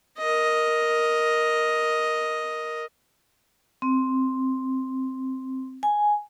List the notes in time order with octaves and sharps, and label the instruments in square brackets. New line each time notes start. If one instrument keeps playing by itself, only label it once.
[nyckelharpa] A#4 D#5
[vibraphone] C4
G#5